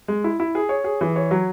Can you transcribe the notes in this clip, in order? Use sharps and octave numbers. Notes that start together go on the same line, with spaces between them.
G#3
E4
E4
G#4
C#5
G#4
E3
C#5
F#3